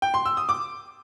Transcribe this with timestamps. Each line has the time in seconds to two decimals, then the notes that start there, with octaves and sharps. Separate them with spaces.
0.02 G5
0.14 C6
0.25 E6
0.37 D#6
0.49 D6